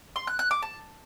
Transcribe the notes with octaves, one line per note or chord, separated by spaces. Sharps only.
C6
F#6
F#6
D6
A5